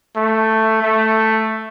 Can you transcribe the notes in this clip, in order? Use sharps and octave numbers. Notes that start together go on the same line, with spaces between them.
A3
A3